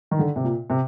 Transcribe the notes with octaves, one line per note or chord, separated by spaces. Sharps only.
D#3
D3
C3
A#2
C3